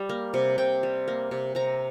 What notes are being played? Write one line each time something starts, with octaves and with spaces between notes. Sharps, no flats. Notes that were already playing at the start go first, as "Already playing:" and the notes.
Already playing: G3
A#3
C3
C3 G5
G3
A#3
C3
C3 A#5